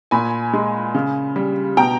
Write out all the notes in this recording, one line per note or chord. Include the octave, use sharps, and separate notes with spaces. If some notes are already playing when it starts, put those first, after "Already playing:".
A#2 G#5 B5
G#3
C#3
G3
B2 G5 A#5